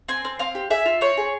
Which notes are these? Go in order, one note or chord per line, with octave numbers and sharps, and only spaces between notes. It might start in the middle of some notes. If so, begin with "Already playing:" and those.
C4 G#5
C4
C4 F5
G4
G#4 E5
F4
C4 C#5
G#4